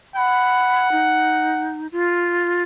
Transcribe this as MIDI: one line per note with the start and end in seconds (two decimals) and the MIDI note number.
0.16 1.79 78
0.16 0.90 83
0.92 1.87 63
1.92 2.63 65